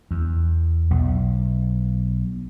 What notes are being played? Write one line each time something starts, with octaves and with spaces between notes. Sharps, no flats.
E2
B1